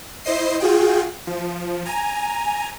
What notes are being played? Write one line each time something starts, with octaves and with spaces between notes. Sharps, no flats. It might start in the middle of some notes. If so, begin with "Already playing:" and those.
E4 C5 D#5 C7
F4 F#4 G#4 G5
F3
G#5 A#5